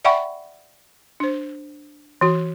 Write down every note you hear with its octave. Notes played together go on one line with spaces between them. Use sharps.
D5 E5 F#5 G5 B5 C#6
D4 C5
E3 F#4